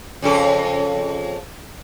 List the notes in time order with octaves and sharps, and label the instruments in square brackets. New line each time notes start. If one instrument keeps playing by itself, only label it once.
[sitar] F2 C#3 A4